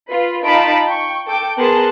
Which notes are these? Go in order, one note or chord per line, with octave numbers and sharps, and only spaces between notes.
F4 B4
D#4 F4 A5 B5 D7
G5 C#6
A4 G5 D6 D7
B3 G#4 A#4 A5 C6 F#6